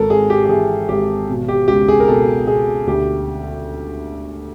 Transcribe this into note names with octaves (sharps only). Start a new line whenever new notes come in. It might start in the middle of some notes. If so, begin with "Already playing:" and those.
Already playing: G#1 A4 A#4
G#1 G#4
G4
G4
E3 G#4
G#1 G4
B2
G4
C#2 G4
G#4
A#4
B2 A4
B2 G#4
D2 G4